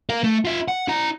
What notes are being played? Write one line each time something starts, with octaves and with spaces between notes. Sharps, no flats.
A#4 F5
A3
F4 E5
F#5
E4 A#5